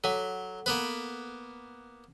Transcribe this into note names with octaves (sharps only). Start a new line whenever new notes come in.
F#3 A4 F#5
A#3 B3 B4